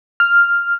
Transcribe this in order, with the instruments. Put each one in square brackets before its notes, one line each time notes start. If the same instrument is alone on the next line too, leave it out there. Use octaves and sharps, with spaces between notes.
[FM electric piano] F6